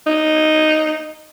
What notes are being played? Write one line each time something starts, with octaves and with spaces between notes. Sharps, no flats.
D#4